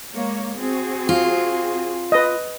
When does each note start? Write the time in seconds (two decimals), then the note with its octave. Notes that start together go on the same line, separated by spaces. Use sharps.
0.14 G#3 A#3 C#5
0.59 C4 F#4 G#4
1.09 F4
2.12 B4 D#5